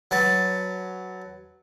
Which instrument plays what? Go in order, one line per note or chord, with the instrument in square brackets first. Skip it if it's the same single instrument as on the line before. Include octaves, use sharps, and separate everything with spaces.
[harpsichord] F#3 B4 A5